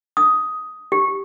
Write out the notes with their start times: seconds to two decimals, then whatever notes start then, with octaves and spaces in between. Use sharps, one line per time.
0.17 D#6
0.92 G4